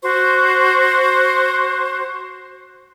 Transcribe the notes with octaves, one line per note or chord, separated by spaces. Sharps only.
F#4 C5 C#6